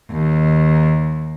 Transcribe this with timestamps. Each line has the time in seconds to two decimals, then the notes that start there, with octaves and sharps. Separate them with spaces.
0.12 D#2